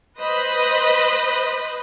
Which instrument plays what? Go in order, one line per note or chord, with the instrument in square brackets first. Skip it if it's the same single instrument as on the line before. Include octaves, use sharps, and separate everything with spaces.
[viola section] B4 C5 D#5 B5